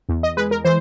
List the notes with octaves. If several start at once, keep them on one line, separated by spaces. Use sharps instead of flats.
E2
D#5
G#3 B4
A#4
E3 C5